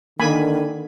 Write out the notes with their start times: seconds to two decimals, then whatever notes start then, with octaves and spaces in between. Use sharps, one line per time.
0.20 D3 D#3 A#3 G#5 B5